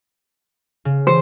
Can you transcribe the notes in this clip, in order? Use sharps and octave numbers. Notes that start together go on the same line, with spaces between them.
C#3
E3 G4 C5